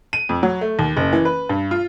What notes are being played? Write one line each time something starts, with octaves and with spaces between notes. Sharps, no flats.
D#7
F2
F#3
A3
D#2
F#1
E3
B4
G2
F4